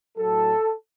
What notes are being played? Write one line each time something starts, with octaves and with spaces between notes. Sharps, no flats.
A2 F#3 A4